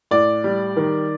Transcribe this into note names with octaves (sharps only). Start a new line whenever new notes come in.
A2 D5
G3
D#3